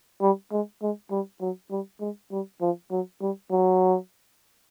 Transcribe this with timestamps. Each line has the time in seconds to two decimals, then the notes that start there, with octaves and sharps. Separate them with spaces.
0.21 G3
0.52 G#3
0.82 G#3
1.11 G3
1.41 F#3
1.71 G3
2.01 G#3
2.31 G3
2.61 F3
2.91 F#3
3.21 G3
3.51 F#3